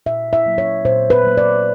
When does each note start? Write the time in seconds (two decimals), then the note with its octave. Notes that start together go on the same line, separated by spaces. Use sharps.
0.06 A#2 E5
0.33 E5
0.46 F#3 A#3
0.58 C#5
0.84 A#2 C5
1.10 B4
1.24 F#3 A#3
1.37 D5